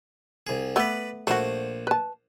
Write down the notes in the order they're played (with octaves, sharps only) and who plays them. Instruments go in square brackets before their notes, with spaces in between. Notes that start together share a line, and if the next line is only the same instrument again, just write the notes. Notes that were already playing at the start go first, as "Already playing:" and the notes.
[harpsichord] C2 G#4
[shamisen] A3 B3 [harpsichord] B4 D5
[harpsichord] A#1 C5 F#5 [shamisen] A3 F#4
[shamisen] B4 A5